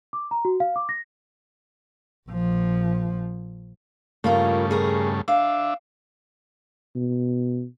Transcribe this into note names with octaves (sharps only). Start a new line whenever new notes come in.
D6
A#5
F#4
F5
D6
A#6
A#1 F3
G2 C#3 A3 A#3 F4 A#4
G#4 A#4
D4 E5 F5
B2